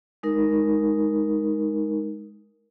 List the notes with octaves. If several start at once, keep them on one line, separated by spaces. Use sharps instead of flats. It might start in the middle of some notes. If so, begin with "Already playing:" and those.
G#3 D#4 A#4